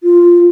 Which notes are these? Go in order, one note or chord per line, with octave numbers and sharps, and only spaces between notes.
F4